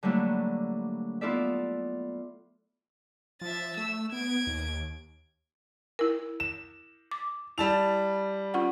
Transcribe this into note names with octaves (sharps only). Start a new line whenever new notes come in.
D3 F#3 G3 A3 A#3 E4
B3 E4 F4 A4 D5 E5
F3 E5 A6
A3 E6
B3 G#6 D7
D#2
E4 A#4
E7
D6
G3 E4 A5 F7
C#4 F4 F#5